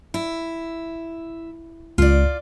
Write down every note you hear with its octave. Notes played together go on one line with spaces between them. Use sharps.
E4
C#2 F4 D5